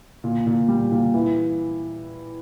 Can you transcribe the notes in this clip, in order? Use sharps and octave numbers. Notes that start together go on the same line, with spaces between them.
A#2
A#2
G3
A#2
E3